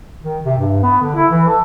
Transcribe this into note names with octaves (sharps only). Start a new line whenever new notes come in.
D#3
C3
G2
B3
D3
E4
E3
A4